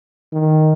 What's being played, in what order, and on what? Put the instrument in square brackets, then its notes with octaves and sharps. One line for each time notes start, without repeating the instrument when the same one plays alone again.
[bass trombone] D#3